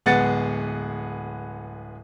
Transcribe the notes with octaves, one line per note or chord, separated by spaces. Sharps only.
D1 G#3 B3 F#5 A6 C#7